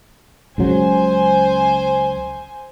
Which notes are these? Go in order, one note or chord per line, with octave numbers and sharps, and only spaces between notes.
C#2 C#3 F#3 C5 G#5